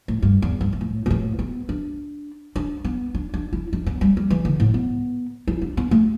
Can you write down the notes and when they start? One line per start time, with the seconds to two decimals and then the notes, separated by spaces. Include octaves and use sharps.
0.08 A2
0.22 G2
0.42 E2
0.61 G2
0.73 G2
0.81 A2
1.06 B2
1.10 A2
1.39 B3
1.69 D4
2.56 D4
2.84 B3
3.15 D4
3.34 D4
3.53 E4
3.73 D4
3.86 B3
4.01 G3
4.17 G3
4.30 E3
4.45 D3
4.60 A2
4.74 B3
5.48 E4
5.62 D4
5.77 B3
5.91 A3